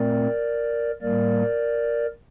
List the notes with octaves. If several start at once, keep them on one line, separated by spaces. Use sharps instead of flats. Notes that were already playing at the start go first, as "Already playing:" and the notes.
Already playing: A#2 A3 C4 A#4 D5
A2 G3 A#3 A#4 D5